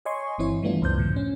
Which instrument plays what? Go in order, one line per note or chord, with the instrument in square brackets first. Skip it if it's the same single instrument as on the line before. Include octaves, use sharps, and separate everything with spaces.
[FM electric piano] C#5 D#5 G#5 C6 C#6
G1 E3 C4 E4 C#5
E3 G3 A3 B3 D4 F4
C#2 F#2 C5 G6
A2 D3 F3
C#4